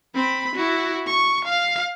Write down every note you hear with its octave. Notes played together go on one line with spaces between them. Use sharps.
C4 B5
E4 F#4
C#6
F5